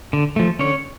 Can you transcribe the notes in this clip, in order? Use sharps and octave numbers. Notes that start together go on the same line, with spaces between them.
D3
F3 A3
D3 C#4 C#5